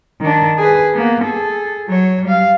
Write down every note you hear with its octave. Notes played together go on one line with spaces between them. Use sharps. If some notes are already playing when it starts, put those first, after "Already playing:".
D#3 D4
G#4 B4
A#3 B3
G#4 A4
F#3 C#5
G3 F5